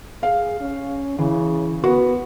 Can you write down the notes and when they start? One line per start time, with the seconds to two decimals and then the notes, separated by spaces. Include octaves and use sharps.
0.23 G#4 F5
0.61 C#4
1.19 C#3 E3
1.84 B3 F#4